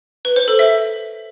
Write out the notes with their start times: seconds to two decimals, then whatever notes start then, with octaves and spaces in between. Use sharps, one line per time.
0.25 B4
0.36 C5
0.48 A4
0.59 E5